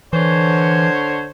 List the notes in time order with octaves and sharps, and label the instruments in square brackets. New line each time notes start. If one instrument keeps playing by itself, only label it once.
[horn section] D3 C5 C#5 [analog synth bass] E3